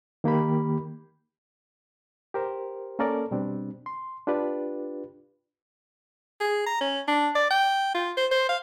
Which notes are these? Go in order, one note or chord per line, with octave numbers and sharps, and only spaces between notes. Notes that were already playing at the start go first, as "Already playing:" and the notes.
D#3 A#3 G4 B5
G4 A#4 C5
A#3 C#4 A4 A#4 D5
B2 G3 C4 D4
C6
D4 F4 G4 B4 D5
G#4
A#5
C#4
D4
D5
G5
F4
C5
C5
F5